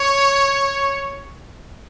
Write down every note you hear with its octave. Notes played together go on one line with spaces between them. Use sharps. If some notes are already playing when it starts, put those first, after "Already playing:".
Already playing: C#5